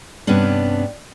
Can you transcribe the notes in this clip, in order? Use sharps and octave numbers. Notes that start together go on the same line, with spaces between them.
G2 C3 B3 C#4 D4